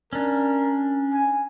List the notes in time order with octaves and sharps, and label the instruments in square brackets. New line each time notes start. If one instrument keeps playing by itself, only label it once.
[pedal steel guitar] C#4 D4 [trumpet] A#4
[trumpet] G#5